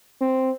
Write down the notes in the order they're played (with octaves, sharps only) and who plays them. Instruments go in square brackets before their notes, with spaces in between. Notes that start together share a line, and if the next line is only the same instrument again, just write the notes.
[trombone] C4